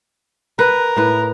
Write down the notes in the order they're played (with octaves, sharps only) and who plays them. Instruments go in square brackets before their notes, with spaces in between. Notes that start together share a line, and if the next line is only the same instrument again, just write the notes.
[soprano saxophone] A#4 [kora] B4
[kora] A2 B4